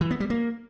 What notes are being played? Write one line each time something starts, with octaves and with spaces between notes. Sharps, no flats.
E3
B3
G3
A#3